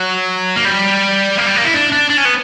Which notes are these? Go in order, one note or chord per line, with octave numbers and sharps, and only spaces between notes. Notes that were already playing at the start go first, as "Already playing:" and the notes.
Already playing: F#3
A#3
G3
A#3
G3
A#3
E4
D4
D4
D4
C#4
B3